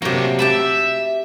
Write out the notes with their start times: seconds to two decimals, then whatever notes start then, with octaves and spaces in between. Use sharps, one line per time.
0.02 C3 F#3 A#3 D4
0.39 G4 E5 A5 B5